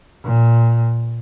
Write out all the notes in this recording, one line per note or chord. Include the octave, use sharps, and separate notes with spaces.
A#2